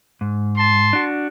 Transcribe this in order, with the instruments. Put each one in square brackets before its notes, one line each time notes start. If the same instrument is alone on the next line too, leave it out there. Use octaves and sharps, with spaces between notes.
[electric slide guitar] G#2
[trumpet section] A5 C6
[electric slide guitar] D4 F#4